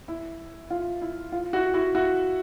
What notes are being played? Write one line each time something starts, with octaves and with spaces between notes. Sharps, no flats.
E4
F4
E4
F4
E4 F#4
E4 F#4
E4 F#4